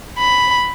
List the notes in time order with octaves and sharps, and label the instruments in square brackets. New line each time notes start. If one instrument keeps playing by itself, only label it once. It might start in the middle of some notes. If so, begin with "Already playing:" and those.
[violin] B5